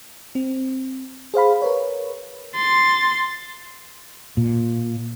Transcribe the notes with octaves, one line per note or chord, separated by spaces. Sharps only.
C4
G#4 C5 F5 B5
A#4 B4 C#5
C6 A6
A#2